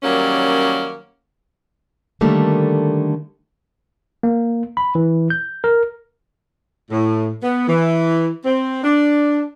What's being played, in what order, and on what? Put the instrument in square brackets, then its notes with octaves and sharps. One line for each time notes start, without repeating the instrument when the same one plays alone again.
[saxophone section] D#3 F#3 G3 A#3 C#4
[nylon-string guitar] D3 D#3 G3 A3 A#3
[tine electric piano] A#3
B5
E3
G6
A#4
[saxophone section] A2
B3
E3
C4
D4